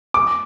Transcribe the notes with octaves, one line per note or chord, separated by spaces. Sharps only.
D6